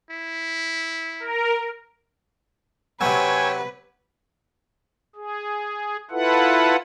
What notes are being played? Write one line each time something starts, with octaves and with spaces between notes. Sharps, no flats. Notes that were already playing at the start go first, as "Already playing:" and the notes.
E4
A#4
C3 F#3 B4 C#5 G5 G#5 E6
G#4
E4 F4 A4 B4 F#5